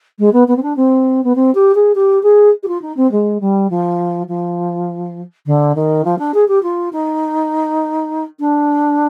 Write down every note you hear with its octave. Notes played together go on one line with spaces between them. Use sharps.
G#3
B3
B3
C4
D4
C4
B3
C4
G4
G#4
G4
G#4
G4
F4
D#4
C4
G#3
G3
F3
F3
D3
D#3
F3
D4
G#4
G4
F4
D#4
D4